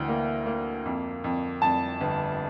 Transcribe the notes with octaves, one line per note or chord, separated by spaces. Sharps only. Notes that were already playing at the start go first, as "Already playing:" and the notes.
Already playing: D2 E3 G5
A#3
A#3
F2
F2
F2 A5
G1